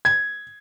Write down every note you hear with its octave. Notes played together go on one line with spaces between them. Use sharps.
G#6